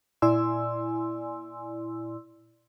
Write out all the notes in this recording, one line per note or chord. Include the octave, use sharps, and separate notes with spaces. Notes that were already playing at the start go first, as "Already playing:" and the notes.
A#2 E4 D5 G#5 C6 E6